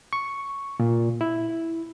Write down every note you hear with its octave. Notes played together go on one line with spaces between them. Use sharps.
C#6
A#2
E4